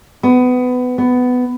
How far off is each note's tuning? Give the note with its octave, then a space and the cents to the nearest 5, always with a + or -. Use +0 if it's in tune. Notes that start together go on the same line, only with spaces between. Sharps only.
B3 +20
B3 +15